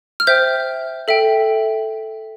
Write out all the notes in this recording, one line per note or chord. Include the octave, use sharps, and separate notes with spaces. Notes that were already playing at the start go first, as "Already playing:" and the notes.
F6
C5 E5 G5 G6
A4 E5 G5